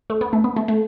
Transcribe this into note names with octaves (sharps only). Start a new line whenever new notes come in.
A3
B3
A3
B3
A3
A3